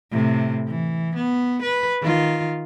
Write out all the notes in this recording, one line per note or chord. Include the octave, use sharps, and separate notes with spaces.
A2 C3
E3
B3
B4
D#3 F4